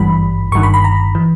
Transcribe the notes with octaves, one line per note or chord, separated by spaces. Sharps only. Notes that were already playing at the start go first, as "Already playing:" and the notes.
Already playing: G#1 G2 E3 G3 B5
G1 G2 D#3 C#6
B5
B5
A#5
E3